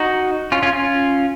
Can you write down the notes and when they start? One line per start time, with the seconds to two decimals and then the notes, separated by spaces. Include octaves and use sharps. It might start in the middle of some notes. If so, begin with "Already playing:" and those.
Already playing: D#4 F#4
0.52 C#4 F4
0.63 C#4 F4
0.73 C#4 F4